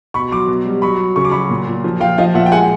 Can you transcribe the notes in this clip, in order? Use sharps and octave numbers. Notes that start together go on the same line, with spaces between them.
B2 B5 C#6
F#3 C6 D6
B2
G3
F#3 B5 C#6
F#3
C#3 C#6
D6
F#3 B5 C#6
A#2
A#2
F3
F3 F5 G5
F3 D#5 F5
A#2 E5 F#5
G5
G#3 F#5 G#5